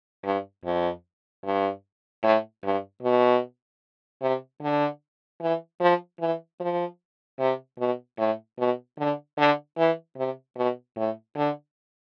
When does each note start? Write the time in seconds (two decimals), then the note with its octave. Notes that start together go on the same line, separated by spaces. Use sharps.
0.24 G2
0.65 F2
1.44 G2
2.23 A2
2.63 G2
3.03 B2
4.22 C3
4.62 D3
5.41 E3
5.81 F3
6.20 E3
6.60 F3
7.40 C3
7.79 B2
8.18 A2
8.58 B2
8.99 D3
9.38 D3
9.78 E3
10.17 C3
10.56 B2
10.96 A2
11.36 D3